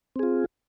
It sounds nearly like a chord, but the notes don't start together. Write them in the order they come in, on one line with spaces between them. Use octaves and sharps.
C4 G#4 F4